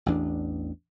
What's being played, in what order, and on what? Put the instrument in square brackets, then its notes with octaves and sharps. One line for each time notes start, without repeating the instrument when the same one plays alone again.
[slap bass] A1 E2 D4